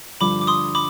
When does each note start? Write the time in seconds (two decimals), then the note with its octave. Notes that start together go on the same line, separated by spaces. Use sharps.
0.21 G2 D3 F3 B5 D6
0.41 D6
0.47 C6 D#6
0.75 B5 D6